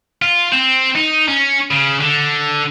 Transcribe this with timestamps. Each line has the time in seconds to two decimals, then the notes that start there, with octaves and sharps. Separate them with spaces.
0.22 F4
0.52 C4
0.95 D#4
1.28 C#4
1.71 C#3
2.01 D3